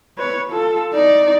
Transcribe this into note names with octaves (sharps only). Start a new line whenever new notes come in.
B4 C#5
F4 A4
D#4 D5